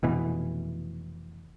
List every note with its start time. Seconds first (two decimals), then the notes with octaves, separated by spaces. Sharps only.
0.03 F1 B2 E3